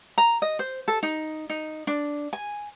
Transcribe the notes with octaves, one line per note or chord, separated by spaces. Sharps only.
A#5
D#5
C5
A4
D#4
D#4
D4
G#5